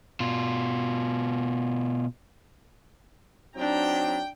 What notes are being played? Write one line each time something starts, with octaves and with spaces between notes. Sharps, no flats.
B2 F4
F#3 C4 D4 D#4 G5 A#5